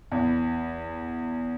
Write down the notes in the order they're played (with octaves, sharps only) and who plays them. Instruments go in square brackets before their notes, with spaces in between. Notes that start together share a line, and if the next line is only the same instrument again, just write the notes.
[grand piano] E2